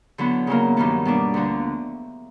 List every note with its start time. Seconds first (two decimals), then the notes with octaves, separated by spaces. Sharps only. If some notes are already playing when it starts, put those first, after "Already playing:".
0.18 D3 F#3 B3 E4
0.47 C#3 F#3 A#3
0.77 G2 D#3 F#3 B3
1.05 B2 G3 A#3 D4
1.34 D2 D3 F3